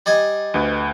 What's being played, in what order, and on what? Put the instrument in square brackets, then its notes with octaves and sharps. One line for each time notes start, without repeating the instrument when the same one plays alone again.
[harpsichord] G3 D#5 G#5
[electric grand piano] D2 B4